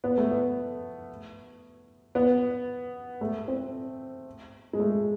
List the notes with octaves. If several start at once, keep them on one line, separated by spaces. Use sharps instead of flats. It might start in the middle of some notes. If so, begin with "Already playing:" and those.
B3
A3
B3
B3
A3
C4
G#3
A3